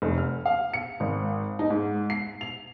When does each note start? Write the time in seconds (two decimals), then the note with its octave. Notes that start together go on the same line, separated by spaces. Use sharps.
0.02 F1
0.18 F6
0.46 F5
0.74 C#7
1.00 G#1
1.59 D#4
1.70 G#2
2.10 C7
2.41 F7